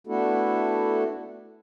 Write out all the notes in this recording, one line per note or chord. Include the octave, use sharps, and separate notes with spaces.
A3 B3 D4 E4 F#4 A4